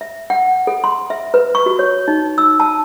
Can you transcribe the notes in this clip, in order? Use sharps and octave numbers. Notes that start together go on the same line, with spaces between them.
E5
F#5
A4
C6
E5
B4
C#6
F#4
C#5
D#4
E6
A5